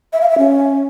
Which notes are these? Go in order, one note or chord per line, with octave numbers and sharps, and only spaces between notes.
E5
F5
E5
C#4